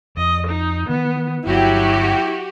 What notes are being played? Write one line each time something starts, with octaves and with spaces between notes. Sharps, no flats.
F2 D#5
D#4
D#3 E3 B3
G1 F#3 E4 F#4 G4